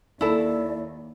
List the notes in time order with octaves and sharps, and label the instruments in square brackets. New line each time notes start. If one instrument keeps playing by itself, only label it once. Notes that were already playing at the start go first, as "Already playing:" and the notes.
[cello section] D#2 [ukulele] E4 A4 [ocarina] D5